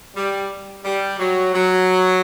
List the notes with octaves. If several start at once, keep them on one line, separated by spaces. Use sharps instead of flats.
G3
G3
F#3
F#3